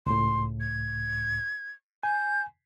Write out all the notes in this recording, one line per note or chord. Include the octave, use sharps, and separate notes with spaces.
C#2 A2 C6
G#6
G#5 G6